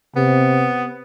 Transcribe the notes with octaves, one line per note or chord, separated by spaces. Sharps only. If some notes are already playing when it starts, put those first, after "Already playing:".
C3 B3